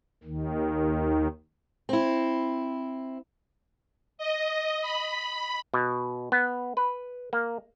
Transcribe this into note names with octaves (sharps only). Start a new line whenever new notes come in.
D#2 D#3
C4 E4
D#5
B5
B2
B3
B4
A#3